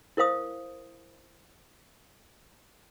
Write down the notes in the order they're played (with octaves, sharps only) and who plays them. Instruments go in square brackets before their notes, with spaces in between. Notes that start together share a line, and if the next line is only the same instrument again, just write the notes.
[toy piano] E4 A#4 C5 F5 D#6